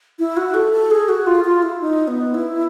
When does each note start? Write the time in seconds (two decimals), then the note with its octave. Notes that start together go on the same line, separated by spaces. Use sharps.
0.19 E4
0.37 F#4
0.54 A4
0.73 A4
0.91 G#4
1.09 F#4
1.26 F4
1.44 F4
1.63 E4
1.81 D#4
2.08 B3
2.34 E4